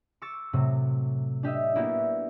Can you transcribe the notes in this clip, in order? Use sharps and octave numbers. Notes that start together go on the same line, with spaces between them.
C#6 D6 E6 A6
A2 C3 F#3
D4 G4 D#5 E5
A#3 B3 D4 E4 F#4 G4